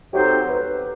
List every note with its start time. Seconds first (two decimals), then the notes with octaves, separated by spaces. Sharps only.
0.12 F#3 C4 D#4 G4 A4 C5
0.49 B4